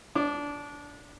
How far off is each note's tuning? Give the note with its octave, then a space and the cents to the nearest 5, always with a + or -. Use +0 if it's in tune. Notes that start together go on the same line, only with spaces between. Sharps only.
D4 -20 D6 +30